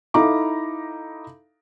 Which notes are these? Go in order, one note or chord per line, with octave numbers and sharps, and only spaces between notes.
D#4 E4 A4 F5 A#5 D6